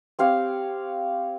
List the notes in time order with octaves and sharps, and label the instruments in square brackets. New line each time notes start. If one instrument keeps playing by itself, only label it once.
[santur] C4 G4 C#5 F5